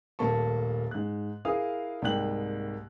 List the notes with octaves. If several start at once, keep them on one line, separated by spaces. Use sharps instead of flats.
D#1 A3 A#3 A5 C#6
G#2 F#6
E4 G#4 A#4 F5 D#6
C2 G#2 A#3 G5 F#6 F#7